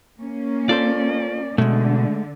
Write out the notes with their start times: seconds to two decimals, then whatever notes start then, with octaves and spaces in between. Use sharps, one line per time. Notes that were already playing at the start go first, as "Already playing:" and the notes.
0.20 A#3 C#4
0.69 F4 A4 C5 D5
1.58 B2 D3 G#3 A3